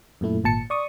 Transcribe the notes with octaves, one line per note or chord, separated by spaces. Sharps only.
F#2 A#2 A3 E4
G#1 A#2 A5 C#7
D5 C#6 D#6